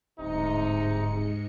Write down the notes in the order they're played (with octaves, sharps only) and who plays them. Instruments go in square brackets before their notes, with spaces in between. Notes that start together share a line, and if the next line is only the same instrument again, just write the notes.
[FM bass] D1 [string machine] G#2 G#3 C#7 [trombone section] C3 D#4